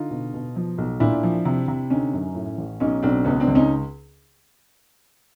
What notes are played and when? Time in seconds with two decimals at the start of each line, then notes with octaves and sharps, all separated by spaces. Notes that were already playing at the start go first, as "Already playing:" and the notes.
Already playing: D3 D#4 F4
0.10 B2
0.34 B2
0.56 F3
0.78 B1
1.00 A#2 D4 E4
1.23 F3
1.45 C3
1.68 C3
1.90 D3 C#4 D#4
2.13 F#2
2.35 A2
2.58 A1
2.80 B1 C#4 D#4
3.03 B1 C4 D4
3.25 C#2 B3 C#4
3.40 C4 D4
3.48 C#2
3.55 C#4 D#4